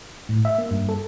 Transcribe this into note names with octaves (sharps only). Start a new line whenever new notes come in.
A2
E5
A#3
G2
A4